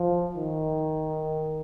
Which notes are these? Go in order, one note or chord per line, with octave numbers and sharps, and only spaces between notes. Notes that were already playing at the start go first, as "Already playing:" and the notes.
Already playing: F3
D#3